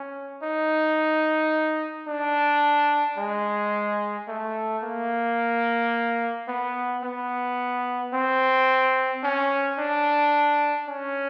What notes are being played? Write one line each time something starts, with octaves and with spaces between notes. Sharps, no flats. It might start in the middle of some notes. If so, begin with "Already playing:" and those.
Already playing: C#4
D#4
D4
G#3
A3
A#3
B3
B3
C4
C#4
D4
C#4